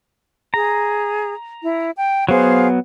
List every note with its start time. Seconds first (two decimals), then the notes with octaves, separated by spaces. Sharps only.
0.54 G#4 A#5
1.62 E4
1.96 G5
2.29 F#3 B3 G#4 C5 F5